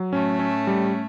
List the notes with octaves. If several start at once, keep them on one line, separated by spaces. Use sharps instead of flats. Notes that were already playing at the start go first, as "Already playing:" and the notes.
Already playing: F#3
A2 A3 C#4
C#4
G3